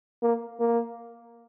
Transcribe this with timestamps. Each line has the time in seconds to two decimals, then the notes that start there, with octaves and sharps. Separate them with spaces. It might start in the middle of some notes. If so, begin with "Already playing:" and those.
0.22 A#3
0.60 A#3